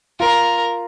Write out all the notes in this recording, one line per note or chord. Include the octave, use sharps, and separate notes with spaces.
F4 A#4